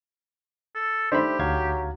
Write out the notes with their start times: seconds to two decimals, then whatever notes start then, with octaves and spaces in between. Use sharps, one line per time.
0.75 A4
1.12 D#3 A3 D4 G4 C5 E5 B5
1.39 D2 F#3 F5 G#6